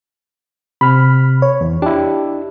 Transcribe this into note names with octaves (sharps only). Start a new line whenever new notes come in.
C3 B5 F6
C#5
E2
D4 E4 G4